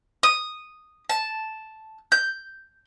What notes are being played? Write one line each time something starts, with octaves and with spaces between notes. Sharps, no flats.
D#6
A5
G6